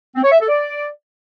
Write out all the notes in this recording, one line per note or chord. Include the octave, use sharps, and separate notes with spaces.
C4
C#5
E5
A4
D5